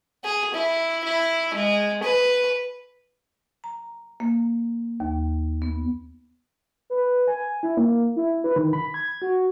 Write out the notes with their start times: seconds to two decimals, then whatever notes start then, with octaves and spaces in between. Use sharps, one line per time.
0.25 G#4
0.54 E4
1.04 E4
1.54 G#3
2.03 B4
3.64 A#5
4.20 A#3
5.00 D#2
5.62 B3
6.90 B4
7.28 G#5
7.63 E4
7.77 A#3
8.16 E4
8.44 B4
8.56 D#3
8.73 B5
8.94 G#6
9.22 F#4